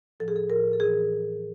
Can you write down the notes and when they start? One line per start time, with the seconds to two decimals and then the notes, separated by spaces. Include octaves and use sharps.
0.20 A2 F3 A4
0.28 G#4
0.36 A4
0.49 A2 F3 A#4
0.73 A4
0.80 A2 E3 G#4